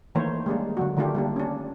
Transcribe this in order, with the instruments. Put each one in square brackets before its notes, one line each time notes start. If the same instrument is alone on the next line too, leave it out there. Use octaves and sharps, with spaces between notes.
[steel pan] D#3 E3 A3 A#3 C5 C#5
G3 G#3 A#3 D4
D3 F#3 F#4
D3 D#3 A3 D4 F4 G4
G3 A#3 D4
C#4 D4